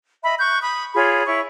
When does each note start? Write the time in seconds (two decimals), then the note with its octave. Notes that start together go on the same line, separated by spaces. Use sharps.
0.24 D#5 E5 B5
0.40 C#6 F#6 G6
0.62 B5 D#6
0.94 F4 G#4 C#5 B5
1.26 E4 C#5 C#6